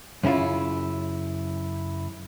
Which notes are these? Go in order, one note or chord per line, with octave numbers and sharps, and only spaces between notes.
F#2 C#3 C#4 E4 F4